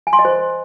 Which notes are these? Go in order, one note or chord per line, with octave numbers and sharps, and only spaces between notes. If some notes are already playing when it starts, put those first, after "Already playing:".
G#5
C6
D#5
C5